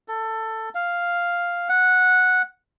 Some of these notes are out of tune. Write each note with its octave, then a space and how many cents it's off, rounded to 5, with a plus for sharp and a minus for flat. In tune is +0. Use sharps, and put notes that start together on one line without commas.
A4 +15
F5 +0
F#5 -10